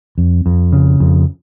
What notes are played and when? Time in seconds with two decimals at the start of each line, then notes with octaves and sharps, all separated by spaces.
0.18 F2
0.46 F2
0.73 C#3
1.00 F2